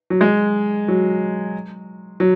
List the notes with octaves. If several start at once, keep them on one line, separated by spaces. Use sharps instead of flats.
F#3
G#3
F#3
F#3